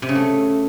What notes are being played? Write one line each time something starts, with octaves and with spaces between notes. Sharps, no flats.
C3
C#3
A3